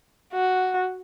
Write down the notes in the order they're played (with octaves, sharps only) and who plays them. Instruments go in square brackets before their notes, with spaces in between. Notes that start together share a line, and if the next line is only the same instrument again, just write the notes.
[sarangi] F#4